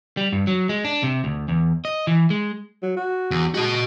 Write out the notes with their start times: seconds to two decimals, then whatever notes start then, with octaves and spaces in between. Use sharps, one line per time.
0.17 G3
0.33 G2
0.47 F#3
0.69 G#3
0.85 D4
1.03 C3
1.24 D2
1.49 E2
1.85 D#5
2.07 E3
2.30 G#3
2.83 F#3
2.97 F#4
3.31 E2
3.54 G#3 F#4 D#5